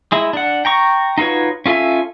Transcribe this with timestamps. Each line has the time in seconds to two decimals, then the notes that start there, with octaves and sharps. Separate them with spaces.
0.12 G#3 E4
0.33 D4 F#5
0.65 G5 A#5 C#6
1.18 D#4 F4 F#4 B4 C#5
1.66 C#4 F4 A4 E5 G#5